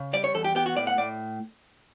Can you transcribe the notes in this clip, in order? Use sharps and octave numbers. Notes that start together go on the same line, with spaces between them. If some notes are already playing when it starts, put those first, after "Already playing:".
Already playing: C#3
G3 D5
C#5
E2 A4
G4
B3 G4
F#4
A2 D5
F#5
A2 D5